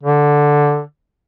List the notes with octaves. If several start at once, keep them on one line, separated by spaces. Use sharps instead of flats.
D3